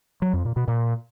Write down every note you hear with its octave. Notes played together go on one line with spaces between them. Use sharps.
F#3
F2
A#2
B2
A#2